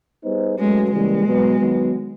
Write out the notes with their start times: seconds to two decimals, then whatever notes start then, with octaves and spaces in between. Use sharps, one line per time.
0.24 G3 B3 D#4 G#4 C5
0.58 F#3 G#3 A3 C#4 F#4 B4
0.91 C#3 E3 G3 G#3 A#3
1.26 B2 F#3 B3
1.60 D#3 F#3 B3